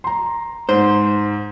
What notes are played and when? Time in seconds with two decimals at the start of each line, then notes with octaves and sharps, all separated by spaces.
0.04 A#5 C6
0.69 G#2 C5